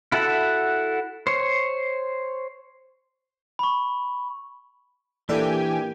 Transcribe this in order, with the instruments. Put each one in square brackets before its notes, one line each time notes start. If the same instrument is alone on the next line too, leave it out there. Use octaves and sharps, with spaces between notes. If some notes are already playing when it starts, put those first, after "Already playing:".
[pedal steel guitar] E4 F#4 A4 E5 F#5
C5 C#5
[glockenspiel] B5 C#6
[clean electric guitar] E3 [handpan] A#3 [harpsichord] D4 E4 A4 [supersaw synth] G4 G5 G#5